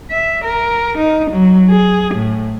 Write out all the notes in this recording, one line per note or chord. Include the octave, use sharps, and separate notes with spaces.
E5
A#4
D#4
F#3
G#4
A2